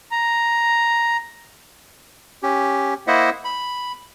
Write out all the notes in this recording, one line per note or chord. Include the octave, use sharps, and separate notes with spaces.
A#5
C#4 G4
A#3 E4 C5 D#5 E5 F#5
B5